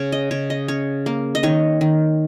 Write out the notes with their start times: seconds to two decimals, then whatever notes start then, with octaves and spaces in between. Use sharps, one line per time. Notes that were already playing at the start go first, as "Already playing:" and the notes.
Already playing: C#3 C#5
0.12 D#5
0.31 C#3 C#5
0.50 D#5
0.68 C#4 C#5
1.06 A#3
1.35 D#5
1.43 D#3 C#5
1.81 D#3